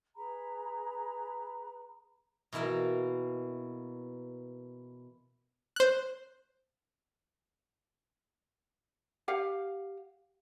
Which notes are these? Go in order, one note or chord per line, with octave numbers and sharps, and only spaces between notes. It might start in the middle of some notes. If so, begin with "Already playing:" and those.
G#4 B4 A#5 B5
B2 E3 A#3 E4 A#4
C5 F#6
G4 F5 F#5